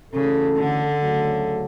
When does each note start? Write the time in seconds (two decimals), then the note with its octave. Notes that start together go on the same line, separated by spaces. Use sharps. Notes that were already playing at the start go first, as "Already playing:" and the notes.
0.14 C#3 E3 A3 C#4 F#4 A4
0.57 D3
1.01 D2 C#3 F#3 A3